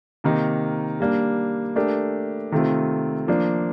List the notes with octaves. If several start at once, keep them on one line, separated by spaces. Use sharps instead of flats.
C3 D#3 A#3 D#4
G3 A#3 D4
A3 D4 G4 A#4
C3 D#3 A3 C4 F4
F3 A#3 D4